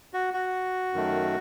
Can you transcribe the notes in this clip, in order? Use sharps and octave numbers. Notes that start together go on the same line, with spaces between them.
F#4
F#4
F#2 D#3 A3